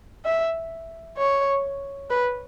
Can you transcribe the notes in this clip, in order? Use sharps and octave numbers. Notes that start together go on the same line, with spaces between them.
E5
C#5
B4